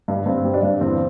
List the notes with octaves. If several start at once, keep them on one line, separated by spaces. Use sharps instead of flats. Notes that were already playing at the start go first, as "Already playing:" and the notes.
G2
G2 C4
G3
D4
G2
E2 C4